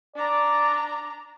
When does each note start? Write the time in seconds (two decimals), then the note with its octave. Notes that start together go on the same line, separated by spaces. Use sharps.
0.16 D4 D5 A#5